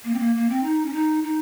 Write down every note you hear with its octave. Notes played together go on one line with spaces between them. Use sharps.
A#3
C4
A#3
A#3
C4
D#4
C#4
D#4
D#4